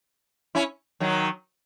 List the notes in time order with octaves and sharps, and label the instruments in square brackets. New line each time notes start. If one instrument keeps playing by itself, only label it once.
[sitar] C#4 E4
D#3 F#3